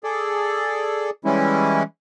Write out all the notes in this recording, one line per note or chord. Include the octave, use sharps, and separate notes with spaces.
G#4 A4 D5
E3 G3 G#3 C#4 E4